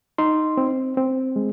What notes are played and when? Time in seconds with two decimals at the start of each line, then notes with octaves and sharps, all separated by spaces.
0.18 D#4 C6
0.57 C4
0.97 C4
1.36 G#3